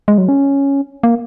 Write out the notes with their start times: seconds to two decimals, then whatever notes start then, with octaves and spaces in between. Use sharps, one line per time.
0.08 G#3
0.18 F#3
0.29 C#4
1.03 A#3